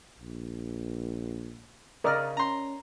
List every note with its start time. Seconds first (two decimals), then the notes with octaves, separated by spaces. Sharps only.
0.20 A#1
2.04 C#3 A#4 D5 D#5 F6
2.37 C#4 A#5 C6